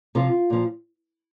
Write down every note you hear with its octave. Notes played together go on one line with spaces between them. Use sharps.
C3 F3 F4
A#2 F3